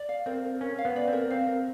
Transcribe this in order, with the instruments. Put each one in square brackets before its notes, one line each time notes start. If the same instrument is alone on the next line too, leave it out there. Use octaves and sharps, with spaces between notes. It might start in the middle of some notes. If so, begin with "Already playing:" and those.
Already playing: [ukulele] D5
F5
[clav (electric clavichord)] C4 [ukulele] A#4
[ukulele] A#4
[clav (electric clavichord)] C#4 [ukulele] A#4
[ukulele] F5
[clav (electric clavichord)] B3
[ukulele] D5
[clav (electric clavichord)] C4 [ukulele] A#4
[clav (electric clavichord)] C4 [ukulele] F5
[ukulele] A#4